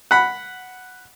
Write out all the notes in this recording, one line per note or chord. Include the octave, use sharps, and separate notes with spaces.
F#5 B5